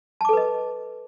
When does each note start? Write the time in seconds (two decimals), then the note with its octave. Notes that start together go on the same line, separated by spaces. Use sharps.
0.21 A5
0.25 D6
0.29 A4
0.33 B4
0.37 D#5